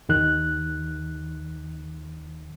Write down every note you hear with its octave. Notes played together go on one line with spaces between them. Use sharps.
D#2 D#3 F#6